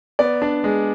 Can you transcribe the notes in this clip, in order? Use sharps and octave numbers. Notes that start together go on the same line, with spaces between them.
B3 D5
D4
G#3